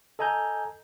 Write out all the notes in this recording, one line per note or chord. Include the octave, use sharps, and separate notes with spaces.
A4 D#5 G#5 A#5 G6